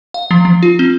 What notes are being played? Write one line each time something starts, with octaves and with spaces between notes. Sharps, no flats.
F5
F3
F3
F4
C4